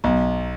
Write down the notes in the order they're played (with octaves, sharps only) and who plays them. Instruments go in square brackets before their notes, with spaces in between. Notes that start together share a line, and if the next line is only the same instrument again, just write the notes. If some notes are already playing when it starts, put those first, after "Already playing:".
[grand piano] B1